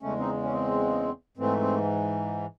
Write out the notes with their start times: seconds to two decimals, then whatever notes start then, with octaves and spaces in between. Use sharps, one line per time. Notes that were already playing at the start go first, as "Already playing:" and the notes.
0.02 E2 C#3 G#3 A3 C#4
0.19 C4 D#4
0.43 C#4
0.53 C4
1.37 G#2 E3 A3 C4
1.60 C4